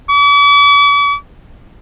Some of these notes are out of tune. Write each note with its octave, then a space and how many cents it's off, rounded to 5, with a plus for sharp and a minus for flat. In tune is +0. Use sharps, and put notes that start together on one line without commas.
D6 -45